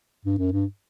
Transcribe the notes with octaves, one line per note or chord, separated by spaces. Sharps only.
G2
F#2
G2